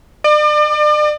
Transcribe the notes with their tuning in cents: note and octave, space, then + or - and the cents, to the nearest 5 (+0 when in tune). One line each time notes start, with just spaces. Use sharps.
D5 +40